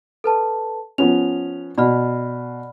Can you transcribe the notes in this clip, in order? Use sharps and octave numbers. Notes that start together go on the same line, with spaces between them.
A4 B4 A5
F3 B3 C#4 F7
B2 D5 B5 F6